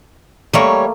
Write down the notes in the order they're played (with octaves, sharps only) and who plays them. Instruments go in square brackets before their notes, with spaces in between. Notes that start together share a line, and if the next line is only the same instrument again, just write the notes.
[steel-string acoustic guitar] G3 C#5 [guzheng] A3 A#3 A#4